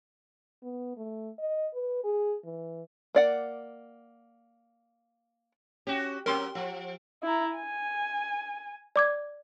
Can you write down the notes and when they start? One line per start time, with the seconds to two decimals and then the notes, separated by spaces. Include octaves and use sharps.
0.63 B3
0.97 A3
1.38 D#5
1.74 B4
2.04 G#4
2.45 E3
3.15 A#3 D5 F#5
5.87 C#4 F#4 G4
6.26 F#3 C4 C#4 G4 A#4 C6
6.55 F3 F#5
7.23 E4 A#5
7.56 G#5
8.96 D5 D6 G#6